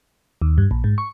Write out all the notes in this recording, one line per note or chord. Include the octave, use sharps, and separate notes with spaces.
D#2
G2
A#1
G#2
C#6